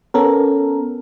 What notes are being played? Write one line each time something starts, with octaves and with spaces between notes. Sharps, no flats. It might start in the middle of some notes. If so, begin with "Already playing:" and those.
B3 C#4 A4 A#4